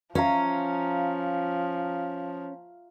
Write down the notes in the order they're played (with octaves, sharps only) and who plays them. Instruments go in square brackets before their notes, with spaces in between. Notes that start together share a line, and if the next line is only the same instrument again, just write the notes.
[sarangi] F3 [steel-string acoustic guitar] C#4 [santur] E5 F5 A#5